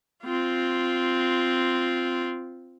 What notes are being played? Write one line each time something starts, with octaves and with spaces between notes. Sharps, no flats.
C4 F4